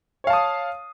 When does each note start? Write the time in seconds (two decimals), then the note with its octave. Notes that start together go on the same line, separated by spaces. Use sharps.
0.24 C#5
0.27 F5
0.30 A5
0.33 D#6